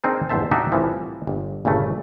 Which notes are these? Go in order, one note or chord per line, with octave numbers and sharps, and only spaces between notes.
C4 D4 D#4 G#4 A#4
G1 E2 G#2 C5 E5 A5
D4 D#4 F#4 G4 D5 E5
C2 A2 E3 F3
G1
G1 A#2 C#3 A3